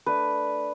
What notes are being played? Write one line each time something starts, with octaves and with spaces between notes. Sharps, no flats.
A3 D4 B4